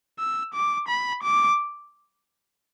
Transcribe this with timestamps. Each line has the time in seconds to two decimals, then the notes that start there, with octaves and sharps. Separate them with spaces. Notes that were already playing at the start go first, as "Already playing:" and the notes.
0.19 E6
0.54 D6
0.88 B5
1.23 D6